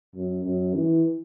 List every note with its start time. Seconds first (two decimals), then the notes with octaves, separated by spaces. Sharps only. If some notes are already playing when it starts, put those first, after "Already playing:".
0.15 F#2
0.45 F#2
0.75 E3